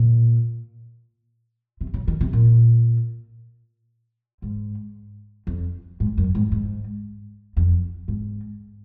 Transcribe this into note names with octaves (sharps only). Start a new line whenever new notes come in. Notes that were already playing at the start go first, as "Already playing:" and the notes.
Already playing: A#2
C3
C#3
D#3
C3
A#2
G#2
F2
G#2
F#2
G#2
G#2
F2
G#2